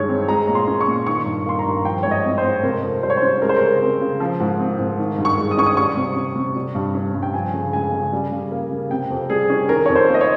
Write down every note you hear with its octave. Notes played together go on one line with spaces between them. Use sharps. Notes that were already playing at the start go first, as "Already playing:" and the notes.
Already playing: G2 D#3 G#3 C#5
C4
G#3 A#5
A#2
C6
C#4
C#6
A#2
D#3 C#6
G2
A#3 C6
A#5
G2
F3 G5
G#2 C#5
D#5
C4
C5
G#2
C3 A#4
F2
G3 C5
C#5
C5
C#4
G#3 A#4
C5
A#4
C#3
C4
C#3
F3
G#2
C4
G#2
D#3
G2
C#6
G#3
D#6
C#4 C#6
D#6
G3 C#6
C3
C#4
C3
G3
G2
C#4
G2
G5
F3 G#5
C#3
G#3 G#5
C#3
G3
C#3
A#3
C#3
C3 G5
F2
G3 G#4
C#4
D#3 A#4
F2 C#5
C5
A#3
D#5
C#5